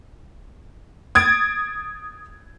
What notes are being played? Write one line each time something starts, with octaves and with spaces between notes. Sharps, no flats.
D#6 G#6 A6 D7